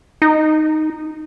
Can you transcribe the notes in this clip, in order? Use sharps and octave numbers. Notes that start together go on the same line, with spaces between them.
D#4